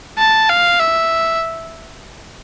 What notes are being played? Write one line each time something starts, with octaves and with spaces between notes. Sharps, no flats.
A5
F5
E5